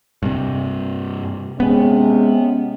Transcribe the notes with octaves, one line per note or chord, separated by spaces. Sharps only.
G2 C3
C3 G#3 B3 C#4